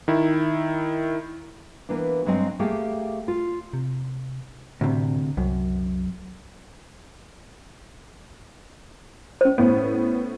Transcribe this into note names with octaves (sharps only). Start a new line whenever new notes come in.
D#3 E4
E3 A#3 B3 D4
G2 F#3 G#3 C4 D#5 G#5
A3 A#3 G4 G#4 F5 G5
F4
C3
D2 A2 C3
C2 F#2
C#4 C5
A2 B3